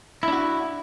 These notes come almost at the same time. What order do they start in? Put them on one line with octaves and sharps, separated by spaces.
E4 D4 F#4